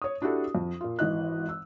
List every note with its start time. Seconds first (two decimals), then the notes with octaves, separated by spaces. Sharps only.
0.02 C#5 D#6
0.22 D4 E4 F#4 G4 A4
0.55 F2
0.81 A#2 F4
0.99 G#1 E3 D#5 F#6
1.49 E6